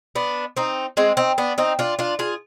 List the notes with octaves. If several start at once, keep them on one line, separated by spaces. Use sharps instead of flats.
B3 D4
C4 D#4
G#3 C4
C4 D#4
B3 D4
C4 D#4
D4 F4
D4 F4
F4 G#4